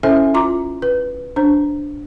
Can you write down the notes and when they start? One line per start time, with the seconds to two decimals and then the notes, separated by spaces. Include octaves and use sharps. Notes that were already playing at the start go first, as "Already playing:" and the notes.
0.03 C#4 E4 A4 C5 E5 G#5
0.34 F4 A#5 D6
0.82 B4
1.36 D4 C5